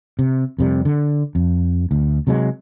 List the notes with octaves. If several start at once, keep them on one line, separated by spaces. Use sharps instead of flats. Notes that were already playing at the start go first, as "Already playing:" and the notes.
C3
F2 C3 G3
D3
F2
D2
C3 F#3 G#3